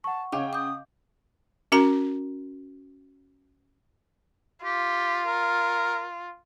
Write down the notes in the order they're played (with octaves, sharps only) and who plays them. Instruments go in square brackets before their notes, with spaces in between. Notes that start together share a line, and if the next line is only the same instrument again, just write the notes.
[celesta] F#5 C#6 [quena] A5
[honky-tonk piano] C#3 G5 [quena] C#5 [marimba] D#5 F5 D6
[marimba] D6 G6 [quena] D#6
[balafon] C#4 F#4 A#4 A#5
[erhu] F4 [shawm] G4
[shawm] A#4